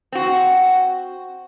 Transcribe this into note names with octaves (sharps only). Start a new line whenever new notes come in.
C4 F#4